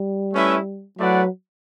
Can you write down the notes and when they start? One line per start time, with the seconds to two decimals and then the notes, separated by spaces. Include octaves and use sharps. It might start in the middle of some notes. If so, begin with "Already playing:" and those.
Already playing: G3
0.33 A3 C#4 E4 B4 E5
0.99 F#3 A3 E4 B4 D5 F#5